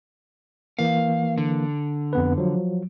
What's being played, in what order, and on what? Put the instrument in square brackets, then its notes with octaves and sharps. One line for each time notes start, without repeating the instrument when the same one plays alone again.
[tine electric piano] E3 A#3 [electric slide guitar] F5
[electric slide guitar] D3
[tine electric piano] F2 B3 B4
F3 F#3